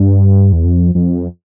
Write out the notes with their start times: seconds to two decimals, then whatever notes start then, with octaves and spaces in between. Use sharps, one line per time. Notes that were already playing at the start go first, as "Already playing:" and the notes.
Already playing: G2
0.52 E2
0.64 F2
0.95 F2